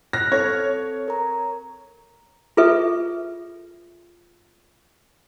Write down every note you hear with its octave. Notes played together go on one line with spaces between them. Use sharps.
F6 F#6 A#6
C4 A4 C#5
A#4 A#5
F4 G#4 A4 B4 E5